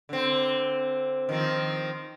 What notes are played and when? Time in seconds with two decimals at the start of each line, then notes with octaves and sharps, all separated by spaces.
0.09 D3 C4
1.29 D#3 F3 C4